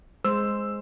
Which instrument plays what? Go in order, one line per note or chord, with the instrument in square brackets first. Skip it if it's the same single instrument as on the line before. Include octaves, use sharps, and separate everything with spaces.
[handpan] G#3 C5 [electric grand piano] E6